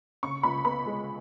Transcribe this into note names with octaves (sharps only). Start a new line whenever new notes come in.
C#3 C#6
C#2 B5
B3 B5
G#3